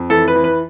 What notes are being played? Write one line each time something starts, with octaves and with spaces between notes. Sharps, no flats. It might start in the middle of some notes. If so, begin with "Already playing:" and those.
Already playing: F2
E3 A4
B4
E3
B4